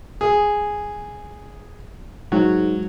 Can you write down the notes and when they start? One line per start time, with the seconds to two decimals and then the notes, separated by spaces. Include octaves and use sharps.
0.21 G#4
2.32 G#2 F#3